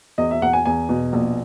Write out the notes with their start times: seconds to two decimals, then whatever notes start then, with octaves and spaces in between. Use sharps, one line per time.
0.18 E2 D#5
0.31 E5
0.42 E2 F#5
0.53 G#5
0.66 E2 G#5
0.89 B2
1.13 A#1